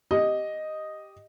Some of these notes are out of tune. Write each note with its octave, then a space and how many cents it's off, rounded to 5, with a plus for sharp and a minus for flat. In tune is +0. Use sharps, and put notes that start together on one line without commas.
G4 +0 D#5 +0